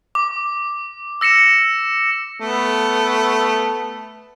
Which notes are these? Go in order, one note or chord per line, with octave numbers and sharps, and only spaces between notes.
D6
E6 A#6 C#7 E7
A3 B3